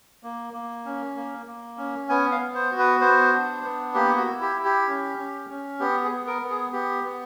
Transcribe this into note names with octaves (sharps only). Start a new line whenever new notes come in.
A#3
A#3
C#4
A#3
A#3
C#4
B3 G#5
F5
B3
C5
F#4
B4
B3 C5
D4
B3
A#3 G4
F#4
E4
G4
E4
G4
C#4
C#4
C#4
B3 G4
G#4
B3
A#4
B3
G#4
B3 G4
B3